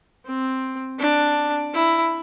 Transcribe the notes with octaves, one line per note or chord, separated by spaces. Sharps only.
C4
D4
E4